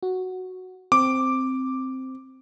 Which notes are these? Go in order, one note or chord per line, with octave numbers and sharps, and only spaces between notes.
F#4
C4 D6